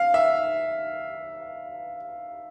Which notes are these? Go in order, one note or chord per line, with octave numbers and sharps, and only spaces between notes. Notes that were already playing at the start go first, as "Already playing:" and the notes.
Already playing: F5
E5